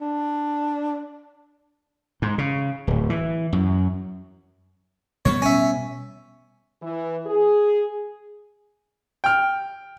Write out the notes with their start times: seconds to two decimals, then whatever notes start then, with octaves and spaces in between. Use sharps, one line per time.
0.01 D4
2.22 G#2
2.38 C#3
2.87 D1
3.10 E3
3.53 F#2
5.25 B2 G3 B3 C#5
5.42 C#4 E5
6.83 E3
7.26 G#4
9.24 G5 F6